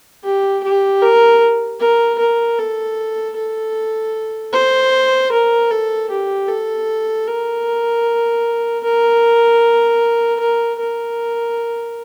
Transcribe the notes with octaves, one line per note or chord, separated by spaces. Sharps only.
G4
G4
A#4
A#4
A#4
A4
A4
C5
A#4
A4
G4
A4
A#4
A#4
A#4
A#4